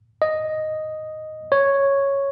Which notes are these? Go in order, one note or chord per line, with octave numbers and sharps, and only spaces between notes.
D#5
C#5